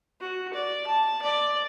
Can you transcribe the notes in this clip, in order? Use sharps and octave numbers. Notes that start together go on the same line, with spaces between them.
F#4
D5
A5
D5